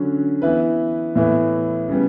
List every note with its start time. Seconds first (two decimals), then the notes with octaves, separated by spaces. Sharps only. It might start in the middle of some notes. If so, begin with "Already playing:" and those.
Already playing: D3 F#3 C#4
0.42 E3 B3 E4 B4
1.15 A2 E3 B3 E4
1.89 C#3 G3 B3